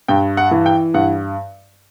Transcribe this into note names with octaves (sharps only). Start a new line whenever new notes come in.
G2 G5
F#5
E3
G5
G2 F#5